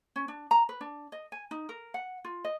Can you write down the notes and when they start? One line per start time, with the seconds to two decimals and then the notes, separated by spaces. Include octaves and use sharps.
0.16 C#4
0.28 D4
0.51 A#5
0.69 B4
0.81 D4
1.12 D#5
1.32 G#5
1.51 D#4
1.69 A#4
1.94 F#5
2.24 F4
2.44 D#5